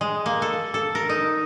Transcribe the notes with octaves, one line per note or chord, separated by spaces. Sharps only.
G#3
A#3
A4
A4
A#4
D#4